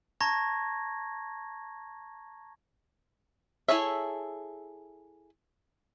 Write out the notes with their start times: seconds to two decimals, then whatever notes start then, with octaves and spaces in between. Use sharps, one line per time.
0.21 A5 A#5 C#6 G#6 A#6
3.68 E4 G#4 A4 C#5 E5